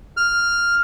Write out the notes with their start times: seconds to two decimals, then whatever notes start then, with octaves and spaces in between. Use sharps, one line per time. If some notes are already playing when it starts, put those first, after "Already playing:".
0.17 F6